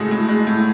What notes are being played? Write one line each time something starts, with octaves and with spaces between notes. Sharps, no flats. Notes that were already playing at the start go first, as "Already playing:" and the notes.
Already playing: A2 C#3 G#3 F#4 A4
A2
G#3
A2